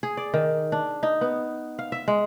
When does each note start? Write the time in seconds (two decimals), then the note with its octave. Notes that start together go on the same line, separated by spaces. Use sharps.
0.03 G#4
0.17 D5
0.34 D#3
0.72 D4
1.03 D#4
1.21 B3
1.79 F5
1.92 E5
2.08 G#3